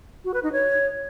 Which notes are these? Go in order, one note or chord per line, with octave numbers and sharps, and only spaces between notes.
F#4
B4
D#4
C#5